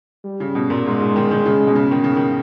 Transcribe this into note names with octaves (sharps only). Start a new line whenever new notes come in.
G3
C#3
B2
A#2
G#2 G#3
G#2
D#3
D#3
C#3
B2
C#3
D#3
C#3 A#3
D#3